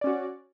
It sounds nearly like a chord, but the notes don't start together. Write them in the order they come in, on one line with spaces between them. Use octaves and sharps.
D5 C#4 F#4